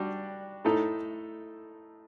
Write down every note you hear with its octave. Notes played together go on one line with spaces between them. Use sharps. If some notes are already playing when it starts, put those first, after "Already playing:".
Already playing: G3 D4 F#4
A2 A3 D#4 A4